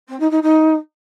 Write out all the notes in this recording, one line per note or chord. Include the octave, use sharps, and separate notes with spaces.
C4
D#4
D#4
D#4